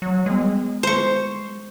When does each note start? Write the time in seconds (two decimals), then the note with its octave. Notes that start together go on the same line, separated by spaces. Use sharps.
0.02 F#3
0.26 G3 G#3 B3
0.83 C5 C#6